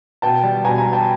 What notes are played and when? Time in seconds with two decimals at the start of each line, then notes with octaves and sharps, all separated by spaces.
0.22 B2 G5 A5
0.44 G3
0.65 B2 G#5 A#5
0.78 G#5 A#5
0.85 G3
0.93 G5 A5